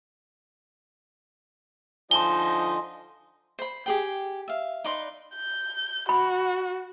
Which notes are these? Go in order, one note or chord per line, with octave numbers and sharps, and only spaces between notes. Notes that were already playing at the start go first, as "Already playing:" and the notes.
D3 F3 D#4 D#5 G#5 A5 C6 G7
C5 B5
G4 G#4 G5
E5 F5
D#4 B4 D5 C6
G6
F#4 B5